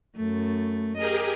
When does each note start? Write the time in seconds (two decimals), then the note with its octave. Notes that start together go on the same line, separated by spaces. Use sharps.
0.16 F#2 A3
0.97 G4 G#4 A#4 D#5